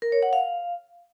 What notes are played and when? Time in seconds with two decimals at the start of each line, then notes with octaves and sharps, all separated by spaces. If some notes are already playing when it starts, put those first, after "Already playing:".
0.02 A#4
0.12 C#5
0.23 F#5
0.33 F5